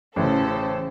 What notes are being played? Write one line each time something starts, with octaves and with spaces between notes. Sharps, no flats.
A1 C#3 A4 C5